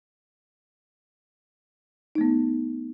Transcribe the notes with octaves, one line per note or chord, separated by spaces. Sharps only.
A3 B3 D#4